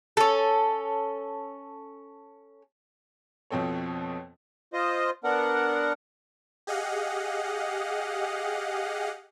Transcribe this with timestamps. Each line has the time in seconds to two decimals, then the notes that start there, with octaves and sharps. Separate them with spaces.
0.17 C#4 A4
3.50 F2 B2 F3 C4 A4 C#5
4.73 F4 C5 D#5
5.24 B3 D4 A#4 F#5
6.67 G4 G#4 D#5 F5 F#5